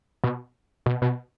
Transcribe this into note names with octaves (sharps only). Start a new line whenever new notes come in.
B2
B2
B2